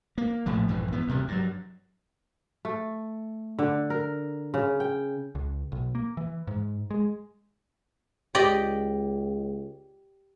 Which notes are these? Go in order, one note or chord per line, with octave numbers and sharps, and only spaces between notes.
A#3
A#1 A2 F3 A3
A#1 G2 E3 F3
E3 B3
D2 C3 G3
G2 F#3
A3
D3
A#4
C#3
G5
C#2
B1
A#3
E3
G#2
G#3
C#2 G4 D5 D#5